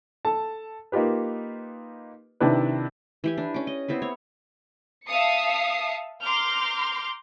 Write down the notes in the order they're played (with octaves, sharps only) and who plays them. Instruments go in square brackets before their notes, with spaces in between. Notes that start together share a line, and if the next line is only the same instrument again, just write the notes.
[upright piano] A4 A5
A#3 D#4 F4 G4 B4
C3 D#3 D4 E4 B4
[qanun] E3 G4 G#5
D4
C#4 D6
D#5
B3 C4 E4 B4
C#5
[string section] E5 F5 A5 D#6 C7 C#7
A#5 C6 D6 F6 G6